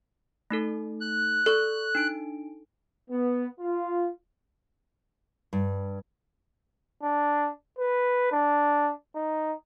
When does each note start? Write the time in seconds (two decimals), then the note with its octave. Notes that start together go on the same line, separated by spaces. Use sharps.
0.51 A3 D#4 A4
1.01 F#6
1.46 A4 D5 C#6
1.95 D4 D#4 D7
3.11 B3
3.60 F4
5.53 G2
7.03 D4
7.79 B4
8.32 D4
9.15 D#4